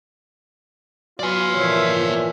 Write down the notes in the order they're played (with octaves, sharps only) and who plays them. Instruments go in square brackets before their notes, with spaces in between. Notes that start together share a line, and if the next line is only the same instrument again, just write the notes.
[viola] F#3 B4 [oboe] F4 [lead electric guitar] D5 G#5
[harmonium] A#2 E3 F3 [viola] C#5 E5